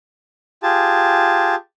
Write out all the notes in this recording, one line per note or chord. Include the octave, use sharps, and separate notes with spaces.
F4 G4 G#4 A5